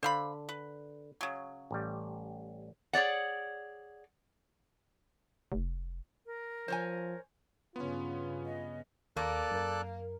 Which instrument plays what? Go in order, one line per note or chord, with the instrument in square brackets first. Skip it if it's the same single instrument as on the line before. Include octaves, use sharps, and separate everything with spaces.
[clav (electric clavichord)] D3 [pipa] C5 F5 B5
[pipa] B4
C#3 F#3
[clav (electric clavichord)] A1 G3
[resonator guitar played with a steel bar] G#4 C#5 D5 F#5
[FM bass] F1
[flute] A#4
[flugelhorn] F3 [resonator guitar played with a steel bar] C5 C#5 G#5
[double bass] G2 C#3 [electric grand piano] B3 C#4 [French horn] F4 [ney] C6
[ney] D#5
[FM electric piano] D#2 [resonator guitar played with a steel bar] A#3 [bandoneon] A4 D5 F#6
[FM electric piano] F#2 A#4